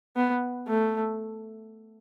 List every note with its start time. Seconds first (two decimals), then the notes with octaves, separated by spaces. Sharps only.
0.16 B3
0.68 A3